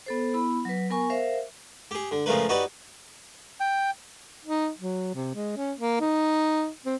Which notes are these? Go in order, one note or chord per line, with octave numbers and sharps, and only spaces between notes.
B3 A4 C5
B3 E4 B5
F#3 B4
B3 A#4 G#5 C#6
A#4 C5 E5 F5
G4 G#4
D3
C#3 F3 G#3 A3 A#4 B4
D#4 F#4 G4 B4 D5
G5
D#4
F#3
C3
G#3
C#4
A#3
D#4
C4